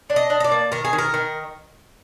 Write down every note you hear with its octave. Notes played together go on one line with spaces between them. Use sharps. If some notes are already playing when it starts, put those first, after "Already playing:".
D4
D#5
D4
D#5
D5
A#3
D#3 A#4
G#4
D#3
A#4
D#3